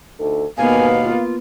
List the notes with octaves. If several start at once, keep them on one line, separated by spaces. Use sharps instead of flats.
D2 D#4 A4
D#2 G#2 B2 A#3 B3 F5 G#5
F4